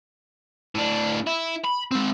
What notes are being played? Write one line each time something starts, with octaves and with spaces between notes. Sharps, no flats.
A2 D4
E4
B5
G#3 C4